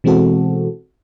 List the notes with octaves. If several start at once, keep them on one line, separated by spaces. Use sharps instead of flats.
B2 E3 G#3 C4 F#4 A4